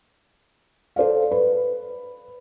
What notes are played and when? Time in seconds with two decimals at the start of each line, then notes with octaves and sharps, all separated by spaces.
0.96 A4 C5 D5 F5
1.31 B4